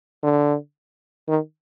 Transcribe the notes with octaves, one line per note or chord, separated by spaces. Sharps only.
D3
D#3